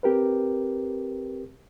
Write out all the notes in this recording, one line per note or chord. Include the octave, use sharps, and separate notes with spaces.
C4 G4 A#4 B4